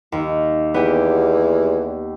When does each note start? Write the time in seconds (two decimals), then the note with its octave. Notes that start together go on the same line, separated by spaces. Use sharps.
0.12 D#2
0.74 E2 B3 G4